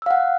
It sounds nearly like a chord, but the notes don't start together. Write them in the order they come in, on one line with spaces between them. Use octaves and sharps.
E6 F5 F#5